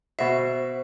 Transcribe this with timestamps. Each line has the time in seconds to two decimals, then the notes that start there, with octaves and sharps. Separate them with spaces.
0.19 B2 F#4 C5 E5